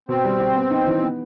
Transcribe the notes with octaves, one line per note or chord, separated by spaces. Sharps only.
B2 C4
G3
G4
B3
D#4
E3
B3